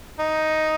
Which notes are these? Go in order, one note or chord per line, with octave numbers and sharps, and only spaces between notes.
D#4